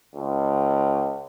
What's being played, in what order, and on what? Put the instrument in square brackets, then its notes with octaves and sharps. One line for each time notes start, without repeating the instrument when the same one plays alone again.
[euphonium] C#2